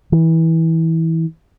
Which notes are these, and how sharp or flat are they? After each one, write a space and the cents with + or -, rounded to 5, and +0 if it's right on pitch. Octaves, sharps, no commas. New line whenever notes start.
E3 -20